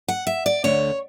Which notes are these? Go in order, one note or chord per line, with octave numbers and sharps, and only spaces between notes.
F#5
E5
D5
D2 D3 A3 C#5